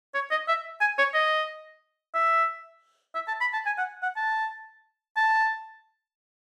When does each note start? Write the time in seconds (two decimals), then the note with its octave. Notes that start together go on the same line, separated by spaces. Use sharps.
0.14 C#5
0.31 D#5
0.48 E5
0.81 G#5
0.98 C#5
1.14 D#5
2.14 E5
3.15 E5
3.28 A5
3.41 B5
3.53 A5
3.66 G#5
3.78 F#5
4.03 F#5
4.16 A5
5.17 A5